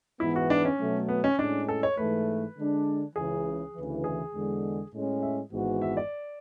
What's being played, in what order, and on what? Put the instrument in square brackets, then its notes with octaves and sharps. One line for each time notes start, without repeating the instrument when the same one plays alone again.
[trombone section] G#2 E3 B3 [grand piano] E4
[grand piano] F#4
D4
C#4
[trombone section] B2 F#3 A3
[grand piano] B3
C#4
[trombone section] A2 G#3 C#4 [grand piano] D4
[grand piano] A4
C#5
[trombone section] G#2 E3 A3 [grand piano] B4
[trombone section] D3 G#3 D4
[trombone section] C#2 C#3 E3 [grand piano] G#4
[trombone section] D2 C#3 E3
[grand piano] G#4
[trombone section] E2 D3 G#3
A2 G#3 C#4
[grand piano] E5
[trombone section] G#1 G#2 E3 B3 F#4
[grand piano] E5
D5